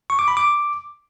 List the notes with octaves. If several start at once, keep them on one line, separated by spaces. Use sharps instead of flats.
C#6
D6
B5
D6